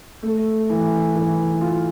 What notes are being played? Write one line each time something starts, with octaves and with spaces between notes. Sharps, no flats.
A3
E3
E3
F4